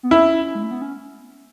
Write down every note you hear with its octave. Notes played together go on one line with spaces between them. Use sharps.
B3
C#4 E4
G#3
A3
B3
C#4